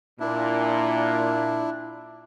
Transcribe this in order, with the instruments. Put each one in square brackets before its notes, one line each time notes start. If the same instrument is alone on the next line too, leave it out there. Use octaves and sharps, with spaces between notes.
[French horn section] A#2 [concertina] D4 E4